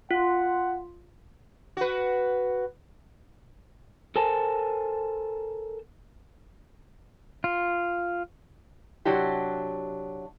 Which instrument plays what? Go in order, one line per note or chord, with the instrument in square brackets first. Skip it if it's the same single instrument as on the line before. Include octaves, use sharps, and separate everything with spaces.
[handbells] F4 [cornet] F#5
[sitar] F#4 B4
[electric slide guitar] A4 A#4 C5 G#5 A5
[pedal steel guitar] F4
[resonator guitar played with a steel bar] C3 F#3 D4 E4 F#4 G4